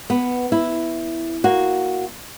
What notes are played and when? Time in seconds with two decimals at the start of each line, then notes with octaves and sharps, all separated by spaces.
0.10 B3
0.52 E4
1.44 A#3 F#4